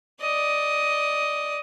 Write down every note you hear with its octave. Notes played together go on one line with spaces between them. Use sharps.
D5 D#5